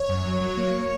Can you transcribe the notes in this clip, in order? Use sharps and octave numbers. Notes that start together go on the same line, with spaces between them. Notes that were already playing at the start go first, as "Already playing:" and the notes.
Already playing: C#5
F#2
F#3
F#3
A#3